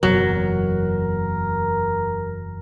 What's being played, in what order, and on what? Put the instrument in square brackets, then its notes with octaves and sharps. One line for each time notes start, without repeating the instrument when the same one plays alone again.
[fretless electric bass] F#1 E2 B2 [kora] F#3 [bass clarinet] A#4